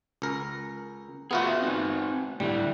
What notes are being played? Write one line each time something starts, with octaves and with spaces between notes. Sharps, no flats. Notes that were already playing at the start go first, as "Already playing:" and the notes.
C#2 A#4
B3 F4 F#4 G#4 A#4 E5
C4 D#4
A2 D3 G3 A3